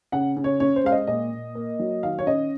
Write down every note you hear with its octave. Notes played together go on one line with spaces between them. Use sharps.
C#3 F#5
C#3
C#5
C#4 C#5
C5
G#3 F5
D#5
A#2 D#5
A#2
A#3
F#3
D#3 F5
C#5
C#4 D#5